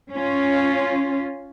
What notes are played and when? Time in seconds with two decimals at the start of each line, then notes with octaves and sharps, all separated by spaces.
0.12 C#4 F4